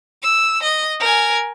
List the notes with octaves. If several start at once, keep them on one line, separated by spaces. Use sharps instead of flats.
E6
D#5
A#4 G#5